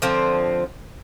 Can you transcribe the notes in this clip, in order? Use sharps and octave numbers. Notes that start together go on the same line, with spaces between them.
D3 F3 C4